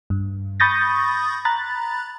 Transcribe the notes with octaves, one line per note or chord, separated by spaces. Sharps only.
G2
B5 C#6 D#6 G6 A6 A#6
A#5 B5 F#6 A6